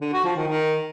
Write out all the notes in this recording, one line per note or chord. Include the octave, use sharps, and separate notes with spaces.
D3
F#4
F3
D#3
D#3